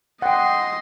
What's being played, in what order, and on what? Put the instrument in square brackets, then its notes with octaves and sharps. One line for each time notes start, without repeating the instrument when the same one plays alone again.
[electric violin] D#5 C6 [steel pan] F#5 G5